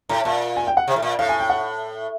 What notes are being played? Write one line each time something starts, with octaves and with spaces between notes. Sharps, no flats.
A2 A#5
A#2 A5
G#5
G5
F#5
C3
A2
A#2
A2 F5
G#5
G5
F#5